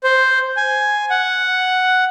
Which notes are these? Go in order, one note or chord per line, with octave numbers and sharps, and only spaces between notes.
C5
G#5
F#5